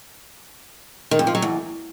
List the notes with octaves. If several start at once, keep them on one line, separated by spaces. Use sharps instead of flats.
D#3
F2
F3
F#3
E2